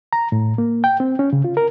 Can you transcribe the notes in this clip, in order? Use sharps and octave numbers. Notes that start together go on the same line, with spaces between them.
A#5
A2
A#3
G5
C4
C#4
C#3
F4
A#4